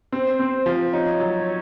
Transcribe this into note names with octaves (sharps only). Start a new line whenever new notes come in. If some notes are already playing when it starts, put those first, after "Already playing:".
C4 C5
C4
F3
D#4 C#5
F#3